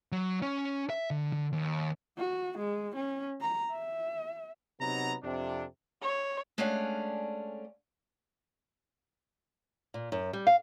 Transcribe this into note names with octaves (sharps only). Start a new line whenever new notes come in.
F#3
C#4
E5
D3
D3
D#2
F#4
G#3
C#4
A#5
E5
C3 F#3 B3 D#4 A#5
F2 C3 D4
C#5
G#3 A3 C#4 D4 F5 F#5
A#2
F#2
G3
F5